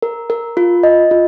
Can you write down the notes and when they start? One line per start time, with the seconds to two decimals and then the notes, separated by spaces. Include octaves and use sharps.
0.02 A#4
0.30 A#4
0.57 F4
0.83 D#5
1.11 F4